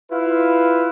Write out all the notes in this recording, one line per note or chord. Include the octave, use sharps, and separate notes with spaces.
E4 F4 B4 F5